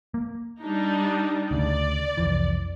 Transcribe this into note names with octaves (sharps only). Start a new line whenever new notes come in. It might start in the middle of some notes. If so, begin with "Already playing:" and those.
A#3
G3 D4 D#4
D2 C#3 D5
C2 F2 E3